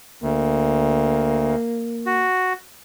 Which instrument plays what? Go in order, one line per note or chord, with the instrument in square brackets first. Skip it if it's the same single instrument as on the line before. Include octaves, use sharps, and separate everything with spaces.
[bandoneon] D2 [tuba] A#3
[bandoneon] F#4